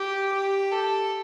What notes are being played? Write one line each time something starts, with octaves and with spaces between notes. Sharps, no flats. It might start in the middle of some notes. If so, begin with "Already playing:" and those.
Already playing: G4
G4
A4